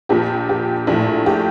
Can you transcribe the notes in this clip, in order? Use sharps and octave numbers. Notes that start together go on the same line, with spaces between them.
A#1 A#2 G4
G4
A#1 A2
G4